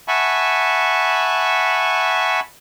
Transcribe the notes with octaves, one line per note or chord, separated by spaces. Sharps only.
E5 F#5 G#5 A5 B5 C#6